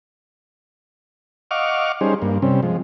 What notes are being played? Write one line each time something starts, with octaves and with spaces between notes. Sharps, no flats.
D#5 F5 F#5 C#6 D6 F6
G3 C#4 D#4 G#4 C5
G2 A#3
C3 G3 C4 C#4
F3 G#3